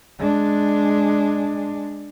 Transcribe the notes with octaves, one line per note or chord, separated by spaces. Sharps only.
G#3 D4